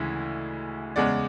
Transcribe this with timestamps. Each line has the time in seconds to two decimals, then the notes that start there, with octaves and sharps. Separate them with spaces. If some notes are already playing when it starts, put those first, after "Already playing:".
Already playing: D2 C#3 E3 G#3
0.96 E2 C#3 G#3 D5 F#5